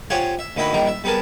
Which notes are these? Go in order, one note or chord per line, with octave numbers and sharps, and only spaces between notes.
F4 G4 C5 C#5 F#5 G#5
E5
D2 D#3 E4 F#4 D#5 B5
A#1 D#3 G3 A#4 F#5
E5
G3 B3 G#4 A#4 A5